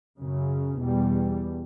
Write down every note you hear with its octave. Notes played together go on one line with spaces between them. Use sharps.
F#2 C#3
E2 B2 G3